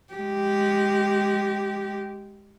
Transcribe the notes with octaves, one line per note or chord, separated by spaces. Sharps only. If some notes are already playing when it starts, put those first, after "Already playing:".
G#3 G4